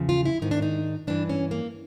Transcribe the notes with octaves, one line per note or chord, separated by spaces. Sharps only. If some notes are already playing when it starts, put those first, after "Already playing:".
Already playing: E2 C#3 F3
F4
E4
G#2 D#3 D#4
D4
D#4
G2 E3 D4
C#4
A#3